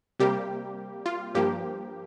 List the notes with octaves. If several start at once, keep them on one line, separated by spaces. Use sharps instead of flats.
C3 G3 A#3 G4
F4
G2 F3 A#3 G4